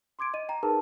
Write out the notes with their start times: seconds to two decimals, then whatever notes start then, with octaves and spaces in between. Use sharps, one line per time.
0.19 C6 D6 G#6 D7
0.34 D#5 D#7
0.49 G5 A#5
0.63 D#4 G#4 A#4 B4 A5